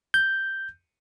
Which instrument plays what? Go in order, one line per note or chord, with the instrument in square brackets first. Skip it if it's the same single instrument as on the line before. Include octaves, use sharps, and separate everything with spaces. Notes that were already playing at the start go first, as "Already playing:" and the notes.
[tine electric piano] G6